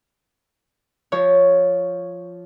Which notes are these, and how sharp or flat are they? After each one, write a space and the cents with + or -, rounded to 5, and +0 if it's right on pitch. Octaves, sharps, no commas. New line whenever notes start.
F3 +0 C#5 +0